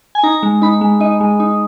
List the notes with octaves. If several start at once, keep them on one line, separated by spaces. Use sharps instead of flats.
G#5
D#4 A#5
G#3
D#4 B5
G#3
D#4 D#5
G#3
D#4